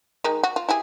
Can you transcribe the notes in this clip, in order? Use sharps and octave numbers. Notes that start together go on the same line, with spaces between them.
D#3 G#3 D#4
F#4
F4
E4 G4 G#4